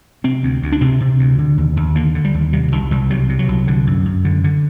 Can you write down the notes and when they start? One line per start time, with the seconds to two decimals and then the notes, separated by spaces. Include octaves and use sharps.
0.24 C3 C4
0.43 D2
0.63 D2
0.72 D4
0.81 C3 C4
1.00 C3
1.19 D2
1.38 D3
1.58 D#2
1.77 D#2
1.95 D3 A#3
2.15 D3
2.25 G3
2.34 D#2
2.53 C3 G3
2.72 C2 D#3
2.91 C2 G3
3.10 C3 F#3
3.29 C3
3.39 F#3
3.49 C2
3.68 D3
3.87 F#2
4.06 F#2
4.25 D3
4.44 D3